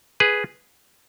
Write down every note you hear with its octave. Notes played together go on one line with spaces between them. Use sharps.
G#4 B4